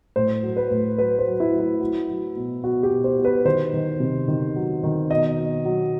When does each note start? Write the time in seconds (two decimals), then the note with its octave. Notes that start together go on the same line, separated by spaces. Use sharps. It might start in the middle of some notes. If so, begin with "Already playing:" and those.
0.16 A2 C5
0.43 F#3
0.57 B4
0.71 A2
0.98 F#3 B4
1.19 C5
1.26 F#3
1.40 E4
1.53 F#3
1.59 E4
1.81 F#3
2.08 F#3
2.36 B2
2.63 B2 F#4
2.83 G4
2.91 B2
3.04 C5
3.19 B2
3.25 B4
3.45 D#3 C5
3.73 D#3
4.00 C3
4.28 D#3
4.56 F#3
4.83 D#3
5.11 B2 D#5
5.38 B2
5.65 F#3